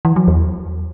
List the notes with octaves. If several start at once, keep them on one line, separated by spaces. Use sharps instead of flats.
E3
F#3
E2